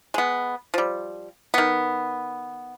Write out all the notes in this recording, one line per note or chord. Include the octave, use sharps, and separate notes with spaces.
G#3 B3
F3 G3
D#3 B3